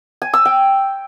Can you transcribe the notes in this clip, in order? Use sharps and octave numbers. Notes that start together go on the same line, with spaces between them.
G#5
E6
G5